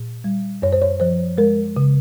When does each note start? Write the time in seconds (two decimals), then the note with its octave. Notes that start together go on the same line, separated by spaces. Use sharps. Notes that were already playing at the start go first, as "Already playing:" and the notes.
Already playing: A#2
0.24 G3
0.62 F#2 C#5
0.73 C5
0.82 C#5
1.00 F3 C5
1.38 G#3 A#4
1.77 C#3